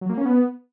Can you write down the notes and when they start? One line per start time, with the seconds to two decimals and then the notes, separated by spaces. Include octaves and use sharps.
0.01 F#3
0.09 A#3
0.17 C#4
0.25 B3